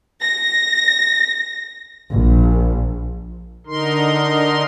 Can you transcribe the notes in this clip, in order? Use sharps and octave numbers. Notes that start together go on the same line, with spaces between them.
A#6
A#1
D3 D#4 A#4 C6